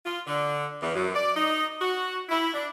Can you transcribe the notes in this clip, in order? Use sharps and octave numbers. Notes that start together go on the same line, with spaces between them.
F4
D3
E2
F#2
D5
D#4
F#4
E4
D4